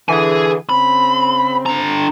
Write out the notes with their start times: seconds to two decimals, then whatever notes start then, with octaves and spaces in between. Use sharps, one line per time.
0.09 D3 E3 G#4 G#5
0.69 C#3 C4 B5
1.66 D3 A#5